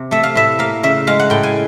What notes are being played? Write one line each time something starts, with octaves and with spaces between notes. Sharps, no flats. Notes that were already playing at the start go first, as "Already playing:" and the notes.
Already playing: C3
A3 E5
F5
A2 E5
A#3 F5
C#3 E5
G#3 F5
F#5
A2 G5
G#5